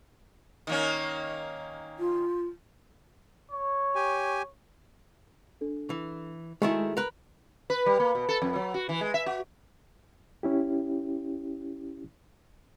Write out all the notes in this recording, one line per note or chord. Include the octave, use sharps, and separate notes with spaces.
D#3 A#3 C#4
F4
C#5
G4 G#5
D4 A4
E3
D#3 G#3 A3 E4 F#4 G#4 G#5
A#4 B4
B4
G3
A#3
B2
A4
F2
F#3
F#4
E3
G#3
E5
F#4
C#4 E4 G4